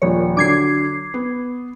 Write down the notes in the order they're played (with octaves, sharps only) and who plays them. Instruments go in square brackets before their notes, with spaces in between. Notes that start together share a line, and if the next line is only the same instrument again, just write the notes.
[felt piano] D#1 A#1 [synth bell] C#5
[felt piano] D3 F#3 [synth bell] D6 G#6 C7
[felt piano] B3